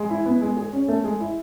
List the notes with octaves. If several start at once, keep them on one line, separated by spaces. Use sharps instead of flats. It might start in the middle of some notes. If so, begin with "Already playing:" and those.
Already playing: G#3
E4
B3
G#3
G#4
C#4
A3
G#3
E4